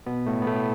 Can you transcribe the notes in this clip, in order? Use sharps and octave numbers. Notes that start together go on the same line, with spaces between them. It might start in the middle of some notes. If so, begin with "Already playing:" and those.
B2 B3
A2 A3
B3
A2 A3